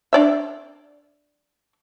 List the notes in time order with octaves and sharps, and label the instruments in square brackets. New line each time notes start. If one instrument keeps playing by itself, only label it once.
[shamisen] D4 D5 E5